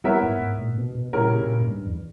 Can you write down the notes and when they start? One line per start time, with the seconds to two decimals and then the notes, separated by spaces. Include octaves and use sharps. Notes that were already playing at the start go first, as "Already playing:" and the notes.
0.04 G3 B3 E4 A#4 C#5 E5
0.23 G#2
0.41 G#2
0.58 A#2
0.78 B2
0.95 B2
1.13 A#2 C#3 G3 C#4 E4 A#4
1.41 A#2
1.61 G#2
1.68 G2
1.86 E2